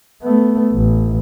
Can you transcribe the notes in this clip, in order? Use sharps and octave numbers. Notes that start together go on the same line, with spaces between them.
A3 B3
A1